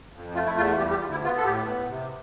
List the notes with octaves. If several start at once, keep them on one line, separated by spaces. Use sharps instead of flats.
F2
A3 F4
E4
E2 F4
G3 G4
G4
D2 F4
E4
B3 F4
A4
A2 G4
B3
C3